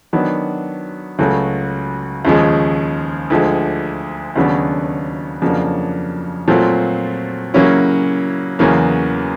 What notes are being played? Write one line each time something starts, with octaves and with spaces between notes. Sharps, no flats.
D#3 F#3 B3 D4
C#2 C#3 F#3 A3
D#2 C#3 F3 G#3
D2 D3 F3 G#3
D#2 C#3 F#3 B3 D4
F2 C#3 F#3 A#3 D4
A#2 F#3 A3 C4 F4
C#3 F#3 A#3 C#4 E4
E2 C#3 F#3 A#3